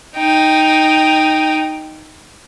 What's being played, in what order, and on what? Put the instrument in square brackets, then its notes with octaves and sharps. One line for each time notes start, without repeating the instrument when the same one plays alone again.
[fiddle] D#4 G5